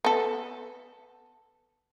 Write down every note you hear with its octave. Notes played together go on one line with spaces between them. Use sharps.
B3 A4